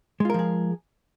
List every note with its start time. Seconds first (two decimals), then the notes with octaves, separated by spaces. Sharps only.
0.20 G#3
0.25 F4
0.30 A#4
0.34 F3
0.39 G#4